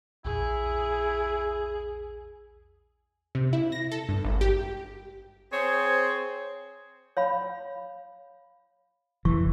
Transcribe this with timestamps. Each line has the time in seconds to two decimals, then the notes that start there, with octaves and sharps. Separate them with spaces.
0.25 A#1 E2 E4 G#4
3.35 C3
3.53 E4
3.72 A#6
3.92 A4
4.09 G2
4.25 G#1
4.41 G4
5.52 C4 G#4 C5 C#5
7.17 C#5 F5 B5
9.25 F1 E3 C#6